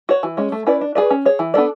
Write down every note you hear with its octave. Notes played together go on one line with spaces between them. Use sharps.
F#4 C#5
E3
G#3 C#4
A3
C#4 E4 B4 D5
D4
G#4 B4 D5
C#4
G#4 C#5
E3
B3 D4 A4 D5